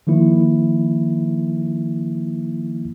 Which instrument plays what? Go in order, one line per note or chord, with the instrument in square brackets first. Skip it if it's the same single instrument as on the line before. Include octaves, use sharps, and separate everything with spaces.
[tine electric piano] D#3 F3 A#3 E4